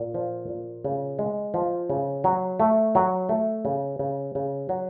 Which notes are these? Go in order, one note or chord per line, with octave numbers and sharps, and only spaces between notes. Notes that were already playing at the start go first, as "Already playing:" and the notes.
Already playing: A#2
F3
A#2
C#3
G#3
F3
C#3
F#3
A3
F#3
A3
C#3
C#3
C#3
F#3